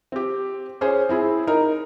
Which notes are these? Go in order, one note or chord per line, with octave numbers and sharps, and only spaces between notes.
C4 G4
C#4 G#4 C5
C4 E4 G#4
D#4 A#4